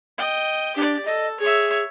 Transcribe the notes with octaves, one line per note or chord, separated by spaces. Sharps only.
D#5 G5
D4 G4 D5
A4 D#5
G#4 C#5 E5